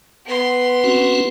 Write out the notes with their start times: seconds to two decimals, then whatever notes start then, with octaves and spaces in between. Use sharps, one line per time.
0.26 B3 C6
0.84 C4 C#4 F#4